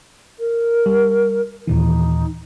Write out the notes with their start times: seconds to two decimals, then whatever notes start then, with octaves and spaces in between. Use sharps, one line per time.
0.39 A#4
0.86 G3
1.67 D#2 A#2 E3 D#4